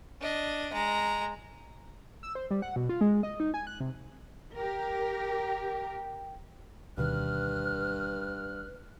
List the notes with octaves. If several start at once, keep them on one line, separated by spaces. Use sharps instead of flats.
D4 D#5
G#3 A#5
E6
C5
G3
F#5
B2
F4
G#3
D#5
D#4
G#5
F#6
C3
G4 A#4 G5
D2 G2 B2 D#3 B4 F6 F#6